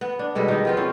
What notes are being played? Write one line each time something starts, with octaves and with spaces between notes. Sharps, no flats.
B3
D4
B2 G3 G#3 A4
D#3 D#4
F3 B3 F4
C4 C#4 F4